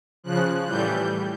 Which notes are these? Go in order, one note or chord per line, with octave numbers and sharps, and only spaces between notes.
C#3 F3 F#6
A2 E3 G3 G6